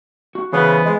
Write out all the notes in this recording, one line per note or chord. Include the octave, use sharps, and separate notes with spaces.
F#4
C#3 E3 B3 C5
G#3